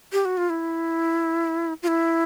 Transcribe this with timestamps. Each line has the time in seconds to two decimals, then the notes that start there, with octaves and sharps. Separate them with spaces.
0.13 G4
0.25 F#4
0.37 F4
0.50 E4
1.83 F4
1.88 E4